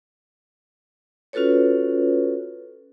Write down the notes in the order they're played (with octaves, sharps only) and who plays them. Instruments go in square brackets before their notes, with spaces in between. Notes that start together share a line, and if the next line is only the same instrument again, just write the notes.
[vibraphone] C#4 F4 F#4 A4 B4 C#5